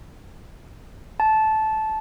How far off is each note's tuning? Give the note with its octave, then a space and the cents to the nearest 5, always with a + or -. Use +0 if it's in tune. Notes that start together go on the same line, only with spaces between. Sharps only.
A5 -15